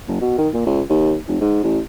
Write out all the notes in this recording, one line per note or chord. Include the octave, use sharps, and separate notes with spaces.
F#1
B2
D#3
A#2
C#2
D#2
F1
G#2
A1